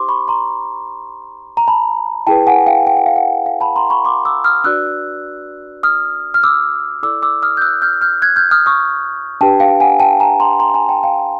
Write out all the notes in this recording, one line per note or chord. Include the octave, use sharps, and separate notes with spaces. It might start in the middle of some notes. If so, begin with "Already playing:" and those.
Already playing: D#4 G4 C5 C6 D6
B5 C#6
A#5 C6
A#5
A5 B5
E4 G#4 B4 G5 A5
F#5 G#5
F5 G5
G5
F#5
F5
F#5
F5
A5 B5
A#5 C6
B5 C#6
C6 D6
D6 E6
D#6 F6
D4 F#4 B4 D5 E6 F#6
D#6 F6
F6
D6 E6
E4 A4 D5 D6 E6
D6 E6
D#6 F6
G6
E6 F#6
F6 G6
F6 G6
F#6 G#6
F6 G6
D#6 F6
C#6 D#6
D4 G4 B4 G5 A5
F5 G5
F#5 G#5
G5 A5
G#5 A#5
A#5 C6
A#5 C6
G#5 A#5
G5 A5
F5 G5